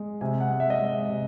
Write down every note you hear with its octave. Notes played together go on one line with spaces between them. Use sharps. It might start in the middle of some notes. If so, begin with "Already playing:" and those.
Already playing: G#3
C3 G#5
F#5
G#3
E5
D#5
G#3 E5
C3